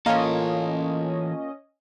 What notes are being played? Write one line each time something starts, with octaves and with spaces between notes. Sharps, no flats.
E3 A#3 C#4 F4 A4 D#5